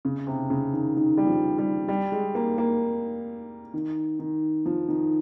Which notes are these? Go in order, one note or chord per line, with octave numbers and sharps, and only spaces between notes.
C#3
C3
C#3
D#3
D#3
G3
F3
G3
G3
G#3
A#3
A#3
D#3
D#3
F3
D#3